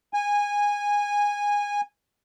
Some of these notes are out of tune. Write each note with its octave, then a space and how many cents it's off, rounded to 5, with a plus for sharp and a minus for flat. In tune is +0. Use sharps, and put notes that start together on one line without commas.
G#5 -15